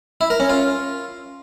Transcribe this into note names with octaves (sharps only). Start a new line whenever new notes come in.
E4
A#4
C#4
F4